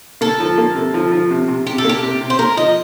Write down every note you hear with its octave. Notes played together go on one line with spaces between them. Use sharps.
A#3 A4
F3
A#3
C3
F3
F3
C3
C3
C3 G4
A4
A#3 G4
C3
C3
C5
A#3 A#4
F3 D#5